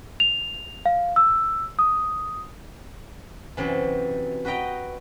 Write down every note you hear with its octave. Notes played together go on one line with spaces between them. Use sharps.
F7
F5
E6
D#6
F#2 C3 E3
F#4 B4 D#5 G5 A#5